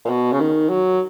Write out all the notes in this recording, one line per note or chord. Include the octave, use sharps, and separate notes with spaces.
A#2
B2
C#3
D#3
F#3